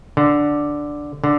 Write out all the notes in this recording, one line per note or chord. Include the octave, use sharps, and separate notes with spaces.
D3
D3